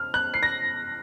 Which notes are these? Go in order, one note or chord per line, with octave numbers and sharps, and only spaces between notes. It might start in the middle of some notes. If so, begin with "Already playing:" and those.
Already playing: F6
F#6
C7
A#6